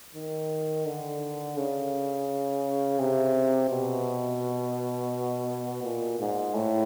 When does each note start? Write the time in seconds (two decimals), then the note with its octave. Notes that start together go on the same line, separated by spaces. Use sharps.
0.15 D#3
0.86 D3
1.57 C#3
2.99 C3
3.70 B2
5.83 A#2
6.19 G#2
6.55 A2